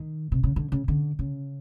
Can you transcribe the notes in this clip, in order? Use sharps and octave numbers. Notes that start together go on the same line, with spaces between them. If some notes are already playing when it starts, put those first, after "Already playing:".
Already playing: D#3
C3
C#3
D3
C#3
D3
C#3